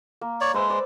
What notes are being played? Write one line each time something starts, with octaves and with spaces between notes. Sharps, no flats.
A#3
C#5 D5
G#3 B4 C5 E5
D5 D6